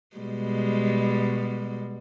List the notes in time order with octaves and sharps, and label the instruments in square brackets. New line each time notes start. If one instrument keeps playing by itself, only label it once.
[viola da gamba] B2 G3 G#3